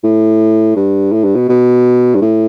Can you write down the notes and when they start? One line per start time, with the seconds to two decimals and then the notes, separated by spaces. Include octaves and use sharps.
0.04 A2
0.76 G2
1.12 A2
1.24 G2
1.36 B2
1.49 B2
2.16 G2
2.22 A2